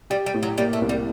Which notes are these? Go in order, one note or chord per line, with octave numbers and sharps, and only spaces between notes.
G3 G4
G3
A2
F#3
G3 A#3
A3
C2
G3